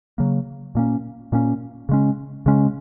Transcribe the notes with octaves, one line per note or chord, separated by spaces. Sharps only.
C#3 F#3 A#3
A#2 A#3 C#4
A#2 A#3 C#4
C#3 G#3 C#4
C#3 G#3 C#4